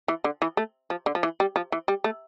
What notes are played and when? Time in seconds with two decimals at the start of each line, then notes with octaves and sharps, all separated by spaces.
0.08 E3
0.24 D3
0.42 E3
0.57 A3
0.90 F3
1.06 D3
1.15 F3
1.23 E3
1.40 G3
1.56 F3
1.72 E3
1.88 G3
2.04 A3